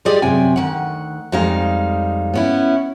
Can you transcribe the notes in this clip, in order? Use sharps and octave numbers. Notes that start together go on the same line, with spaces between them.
G3 F4 G4 G#4 D5 D#5
F#2 C3 G5 G#5
D2 D#3 F#5
F2 G3 G#3 D#4 F5
B3 C#4 E4